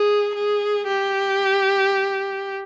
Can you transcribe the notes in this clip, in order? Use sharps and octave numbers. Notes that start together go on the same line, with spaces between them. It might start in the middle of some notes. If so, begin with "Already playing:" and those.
Already playing: G#4
G#4
G4